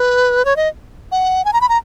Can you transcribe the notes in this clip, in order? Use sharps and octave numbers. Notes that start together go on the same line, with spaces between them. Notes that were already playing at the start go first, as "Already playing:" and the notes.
Already playing: B4
C#5
D#5
F#5
G#5
A#5
B5
A#5